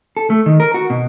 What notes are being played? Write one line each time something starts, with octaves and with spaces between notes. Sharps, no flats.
A4
A3
D#3
A#4
F#4
B2